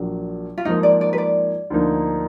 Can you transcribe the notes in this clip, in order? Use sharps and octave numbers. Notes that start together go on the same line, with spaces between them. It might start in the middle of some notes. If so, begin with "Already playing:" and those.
Already playing: A#1 A#2 F#3
F4
G#2 F3 A#3 D#4
D5
D5
B4
D5
D2 D3 F3 A#3 D#4